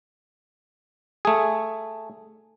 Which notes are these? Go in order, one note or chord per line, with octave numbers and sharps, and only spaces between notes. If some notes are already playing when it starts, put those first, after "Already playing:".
A3 G#4